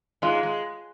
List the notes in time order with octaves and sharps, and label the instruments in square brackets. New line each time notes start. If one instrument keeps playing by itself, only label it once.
[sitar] G#2 G#3 [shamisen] F4
[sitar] G#3